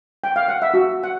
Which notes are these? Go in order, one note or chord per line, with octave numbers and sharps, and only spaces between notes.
G5
F5
F#5
E5
F#4
F#5